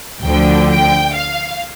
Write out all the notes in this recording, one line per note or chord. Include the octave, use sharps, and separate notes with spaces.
D2 D3 F3 G5
G5
F5